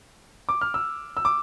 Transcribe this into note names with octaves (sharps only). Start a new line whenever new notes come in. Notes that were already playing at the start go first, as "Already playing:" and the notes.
D6
F6
E6
E6
D6